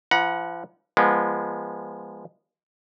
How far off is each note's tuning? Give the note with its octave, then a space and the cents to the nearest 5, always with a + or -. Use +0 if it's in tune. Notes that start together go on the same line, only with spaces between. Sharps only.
F3 -40 F#5 +0 A#5 +45
F3 -20 G#3 -20 B3 -35